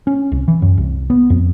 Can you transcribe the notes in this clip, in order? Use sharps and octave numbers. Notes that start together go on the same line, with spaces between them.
C#4
C2
E3
F#2
C2
B3
F2